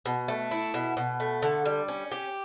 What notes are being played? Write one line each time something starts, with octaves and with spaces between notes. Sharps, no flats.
B2
A3
E4
B2
B2
A3
D3
G3
C#4
G4